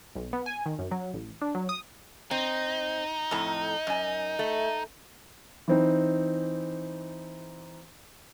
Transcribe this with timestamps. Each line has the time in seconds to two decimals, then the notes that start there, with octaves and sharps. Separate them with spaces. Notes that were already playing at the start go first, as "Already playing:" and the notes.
0.16 B1
0.33 B3
0.46 G#5
0.66 D#3
0.79 F#2
0.91 F#3
1.14 A1
1.41 D4
1.55 F#3
1.69 D#6
2.31 C4 D#4
3.31 F2 A2 A#5
3.87 F#2 G#5
4.39 A3
5.68 E3 C4 D#4